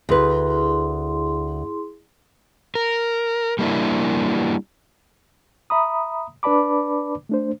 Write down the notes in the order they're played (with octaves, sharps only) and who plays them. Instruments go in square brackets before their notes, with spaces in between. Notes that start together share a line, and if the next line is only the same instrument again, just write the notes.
[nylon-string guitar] D2 B4 [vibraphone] E4 G#4 C6
[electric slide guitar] A#4
G3 A#3 C#4 D4 E4
[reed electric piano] E5 A#5 B5 D#6
D4 B4 D5 A5 B5 D6
A3 D4 C5